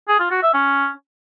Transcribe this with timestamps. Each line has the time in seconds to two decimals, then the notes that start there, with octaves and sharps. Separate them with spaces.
0.08 G#4
0.20 F4
0.31 F#4
0.43 E5
0.54 C#4